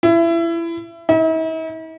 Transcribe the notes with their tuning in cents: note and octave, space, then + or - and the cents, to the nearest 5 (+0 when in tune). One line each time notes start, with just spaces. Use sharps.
E4 +25
E4 -45